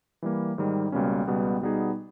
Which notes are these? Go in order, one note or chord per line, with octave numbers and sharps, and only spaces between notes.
E3 G3 A#3
G#2 D#3 G3
C#2 B2 G3 A#3 C#4
C#2 B2 G3 B3
B2 G3 B3 D#4 G#4